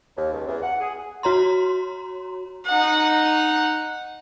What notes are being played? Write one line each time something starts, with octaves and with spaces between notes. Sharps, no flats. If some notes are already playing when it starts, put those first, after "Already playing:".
D#2
C#2
E2
F#5
G#4
F#4 C#5 A#5 C6
D#4 F#5